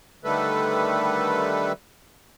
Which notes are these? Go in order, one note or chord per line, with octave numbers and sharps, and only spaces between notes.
D3 D#3 G3 A3 A4 B4